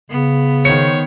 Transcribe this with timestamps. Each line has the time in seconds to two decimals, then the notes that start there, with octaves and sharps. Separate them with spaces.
0.11 C#3 B3
0.65 D#3 C5 C#5 C#7